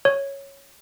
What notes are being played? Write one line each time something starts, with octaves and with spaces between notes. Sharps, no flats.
C#5